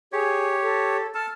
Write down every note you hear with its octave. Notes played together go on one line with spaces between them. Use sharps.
G4 G#4 C#5
A4
A4 A5 F6